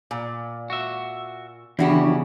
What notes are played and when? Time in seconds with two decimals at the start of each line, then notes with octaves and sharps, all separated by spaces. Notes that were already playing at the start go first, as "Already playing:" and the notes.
0.11 A#2
0.70 F#4 E5
1.79 E2 C#3 E3 D4 E4 F#4 G4